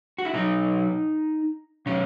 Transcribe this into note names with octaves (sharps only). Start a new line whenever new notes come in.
F#4
E4
B2 F#3 D#4
B2 F#3 C#4